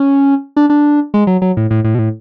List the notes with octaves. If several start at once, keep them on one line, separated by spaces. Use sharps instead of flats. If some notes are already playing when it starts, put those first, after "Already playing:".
Already playing: C#4
D4
D4
G#3
F#3
F#3
A2
A2
A2
B2
A2